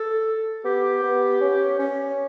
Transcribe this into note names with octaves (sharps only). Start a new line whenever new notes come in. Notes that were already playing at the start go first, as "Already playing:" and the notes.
Already playing: A4
B3 G4
B3
C#4
C#4